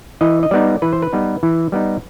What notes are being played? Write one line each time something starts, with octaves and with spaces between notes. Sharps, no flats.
E3 D#5
D#5
G3 B3 D#4 D5
E3 B4
C5
B4
G3 B3 D#4
E3
G3 B3 D#4